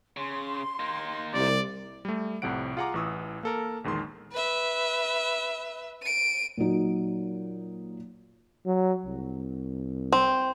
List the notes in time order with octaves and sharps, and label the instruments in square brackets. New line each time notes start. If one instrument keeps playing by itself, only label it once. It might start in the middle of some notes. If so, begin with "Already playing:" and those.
[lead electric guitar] C#3 [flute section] C6
[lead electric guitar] A#3 D#4
[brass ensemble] C2 [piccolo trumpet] D5
[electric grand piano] G3 A3
C2 F2 A2 C3 F#5 D7
F4 G#4 F#5 G#5 A#5 D6
A1 E3 C#6 D#6 E6
A#3 A4 A#4
A#1 E2 D#3 G#3 C6
[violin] B4 E5
D7 D#7
[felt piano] A#2 F#3 D#4 F#4
[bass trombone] F#3
C2
[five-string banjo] C4